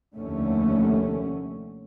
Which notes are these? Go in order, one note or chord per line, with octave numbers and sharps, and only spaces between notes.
F1 D#2 D3 A3 C#4